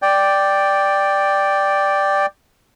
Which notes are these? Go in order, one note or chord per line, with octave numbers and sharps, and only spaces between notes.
D5 G5